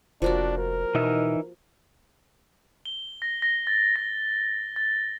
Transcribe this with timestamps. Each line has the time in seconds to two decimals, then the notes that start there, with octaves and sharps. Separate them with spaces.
0.22 F1 F3 A#3 D4 F#4
0.58 A#4
0.95 B2 E3 D#4 E5
2.85 G7
3.22 A#6
3.42 A#6
3.67 A6
3.96 A#6
4.76 A6